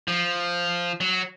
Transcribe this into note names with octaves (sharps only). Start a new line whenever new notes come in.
F3
F#3